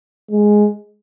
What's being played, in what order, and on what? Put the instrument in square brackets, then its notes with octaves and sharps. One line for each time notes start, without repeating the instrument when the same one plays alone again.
[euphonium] G#3